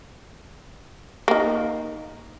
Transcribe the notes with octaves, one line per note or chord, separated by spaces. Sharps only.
D#3 A#3